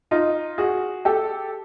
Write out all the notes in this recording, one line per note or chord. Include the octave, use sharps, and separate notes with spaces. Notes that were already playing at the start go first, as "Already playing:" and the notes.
D#4 F4
F#4 G#4
G4 A4